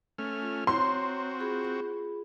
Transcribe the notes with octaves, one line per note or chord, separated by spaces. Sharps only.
A3 C#4 F6
F4
C4 F#4 C#5 A#5 C6
F4 G#4 B5